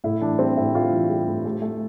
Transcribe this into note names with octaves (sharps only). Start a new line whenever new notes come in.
A2 E4
E3 D4
G3 C4
A2 E4
A2 F4
E3
G3
A2
A3
A3